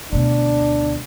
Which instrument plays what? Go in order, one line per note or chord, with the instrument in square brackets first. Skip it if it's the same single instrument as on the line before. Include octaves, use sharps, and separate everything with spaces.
[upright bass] D2 B2 [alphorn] D4